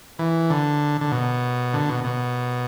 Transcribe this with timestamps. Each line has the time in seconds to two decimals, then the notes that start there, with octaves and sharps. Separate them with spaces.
0.19 E3
0.50 D3
1.01 D3
1.12 B2
1.74 D3
1.89 B2
2.04 B2